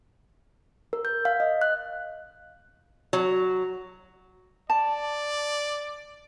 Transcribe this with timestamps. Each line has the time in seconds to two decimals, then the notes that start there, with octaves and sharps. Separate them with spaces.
0.93 A#4
1.05 G6
1.25 F5
1.40 D#5
1.61 F#6
3.13 F#3
4.70 D5 A5